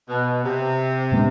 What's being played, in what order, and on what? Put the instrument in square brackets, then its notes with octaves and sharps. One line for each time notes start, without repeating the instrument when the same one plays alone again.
[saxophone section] B2
C3
[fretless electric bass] A2 G#3 B3 D4